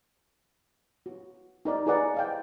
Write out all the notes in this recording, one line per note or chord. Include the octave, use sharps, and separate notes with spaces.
F#4
D#4 A#4 D5
E4 G#4 A#4 B4 D5 F#5
D#5 F5 G5